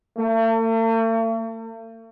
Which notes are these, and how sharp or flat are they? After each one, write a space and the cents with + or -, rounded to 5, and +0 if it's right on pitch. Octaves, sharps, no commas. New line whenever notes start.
A3 +45